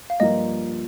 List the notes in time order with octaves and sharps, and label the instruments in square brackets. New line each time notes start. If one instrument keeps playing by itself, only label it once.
[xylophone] F5
[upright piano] G2 F3 A#3 F4 [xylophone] D#5